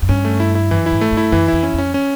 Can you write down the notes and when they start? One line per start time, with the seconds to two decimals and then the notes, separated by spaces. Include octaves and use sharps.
0.02 F#2
0.09 G2 C#4
0.25 A3
0.40 E4
0.55 E4
0.71 F#2 E3
0.86 E4
0.92 G#2
1.01 A3
1.12 G2
1.17 E4
1.32 F#2 E3
1.48 F2 E4
1.63 C#4
1.74 F2 C#4
1.94 C#4